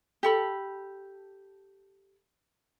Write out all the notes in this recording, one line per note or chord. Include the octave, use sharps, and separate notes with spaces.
G4 A4 B5